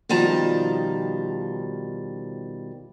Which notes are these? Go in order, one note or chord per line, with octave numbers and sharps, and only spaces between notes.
B2 D#3 F3 G3 A5 A#5